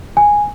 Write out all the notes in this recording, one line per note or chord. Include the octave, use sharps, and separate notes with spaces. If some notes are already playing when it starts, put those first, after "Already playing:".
G#5